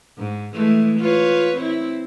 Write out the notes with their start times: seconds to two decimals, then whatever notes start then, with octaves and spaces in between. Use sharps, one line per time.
0.18 G#2
0.53 E3 G#3 A3
1.00 F4 B4 C#5
1.56 C4 E4